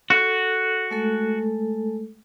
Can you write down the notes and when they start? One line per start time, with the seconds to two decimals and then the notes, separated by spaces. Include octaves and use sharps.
0.10 F#4 A4
0.91 G#3 A3 A4